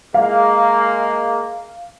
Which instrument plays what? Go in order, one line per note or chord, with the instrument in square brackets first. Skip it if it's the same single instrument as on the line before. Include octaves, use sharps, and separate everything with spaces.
[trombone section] G#3 A#3 [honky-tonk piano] F5